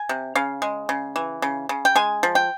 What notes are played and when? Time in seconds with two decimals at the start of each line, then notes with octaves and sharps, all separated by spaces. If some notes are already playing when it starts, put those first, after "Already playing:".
Already playing: G#5
0.09 C3
0.35 C#3 F5
0.62 G#3
0.89 C#3
1.16 E3
1.42 C#3
1.69 C#3
1.85 G5
1.95 G#3 G#5
2.23 F3
2.35 G5